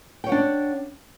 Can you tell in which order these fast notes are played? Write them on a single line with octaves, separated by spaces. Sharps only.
G5 C#5 F#5 D4